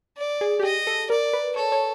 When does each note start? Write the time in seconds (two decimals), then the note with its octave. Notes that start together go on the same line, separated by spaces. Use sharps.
0.18 D5
0.41 G#4
0.59 G4
0.63 G#4 D#5
0.87 A4
1.10 A#4 D5
1.33 B4
1.56 A4 C#5
1.72 C#5